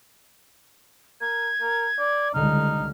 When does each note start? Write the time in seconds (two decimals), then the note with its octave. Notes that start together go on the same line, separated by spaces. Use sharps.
1.21 A#4 G#6
1.61 A#4
1.99 D5
2.34 C#2 D3 G3 D#4 F6